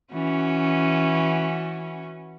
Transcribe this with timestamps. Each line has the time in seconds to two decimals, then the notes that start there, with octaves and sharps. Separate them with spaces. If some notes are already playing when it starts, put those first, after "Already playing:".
0.14 E3 C#4 F#4